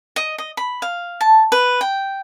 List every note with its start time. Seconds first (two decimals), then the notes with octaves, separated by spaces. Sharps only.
0.16 D#5
0.38 D#5
0.57 B5
0.82 F5
1.21 A5
1.52 B4
1.81 G5